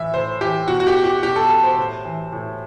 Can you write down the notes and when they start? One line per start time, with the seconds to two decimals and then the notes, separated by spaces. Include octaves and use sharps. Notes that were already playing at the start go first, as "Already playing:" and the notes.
Already playing: A2 E3 E5
0.14 A2 C5
0.41 E3 G4
0.68 B2 F#4
0.80 F#4
0.87 G4
1.04 G4
1.23 B2 G4
1.36 A4
1.50 A4
1.64 C5
1.77 A2
2.05 E3
2.32 A2